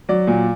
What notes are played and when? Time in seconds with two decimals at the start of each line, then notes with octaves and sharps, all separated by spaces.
0.09 F#3 D5
0.27 A#2